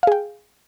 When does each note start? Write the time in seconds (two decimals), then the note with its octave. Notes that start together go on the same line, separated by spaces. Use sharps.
0.03 F5
0.07 G#4
0.12 G5